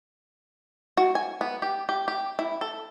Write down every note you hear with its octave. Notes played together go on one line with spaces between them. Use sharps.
F#4
G#5
B3
G4
G4
G4
E4
A4